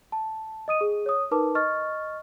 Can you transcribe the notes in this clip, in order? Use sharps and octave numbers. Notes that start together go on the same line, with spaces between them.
A5
D#5 D#6 D#7
G#4
C#5 D#6
D#4 A#4 B4 A5 D6
D#5 C#6 F6 A6